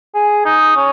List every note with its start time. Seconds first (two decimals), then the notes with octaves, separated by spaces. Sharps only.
0.15 G#4
0.45 D#4
0.76 C#4